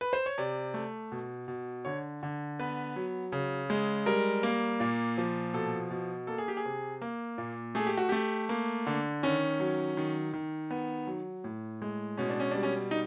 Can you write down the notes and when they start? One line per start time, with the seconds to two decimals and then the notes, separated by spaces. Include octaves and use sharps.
0.01 B4
0.13 C5
0.26 C#5
0.38 C3 D5
0.74 A3
1.12 B2
1.48 B2
1.85 D3 C#5
2.23 D3
2.59 B3 B4
2.96 F#3
3.32 C#3
3.70 G#3
4.06 G3 A#4
4.43 A#3
4.80 A#2
5.18 F3
5.53 B2 A4
5.91 B2
6.27 A#3 A4
6.38 G#4
6.48 G4
6.57 G#4
6.65 C3
7.02 A#3
7.38 A#2
7.75 A3 G#4
7.86 G4
7.98 F#4
8.09 A3 G4
8.49 A#3
8.87 D3
9.23 D#3 C#4
9.60 F#3
9.97 D#3
10.34 D#3
10.71 B3
11.07 F#3
11.44 A2
11.82 G#3
12.17 B2 C#4
12.30 D4
12.40 C#4
12.51 G3 D4
12.63 C#4
12.91 D#4